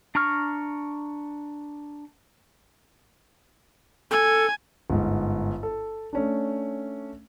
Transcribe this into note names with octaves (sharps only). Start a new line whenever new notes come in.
D4 A#5 C#6 F6
A4 G#5
G1 G#2
A4
A3 C#4 D4